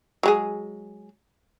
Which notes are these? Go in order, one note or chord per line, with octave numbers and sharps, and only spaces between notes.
F#3 G#3 G#4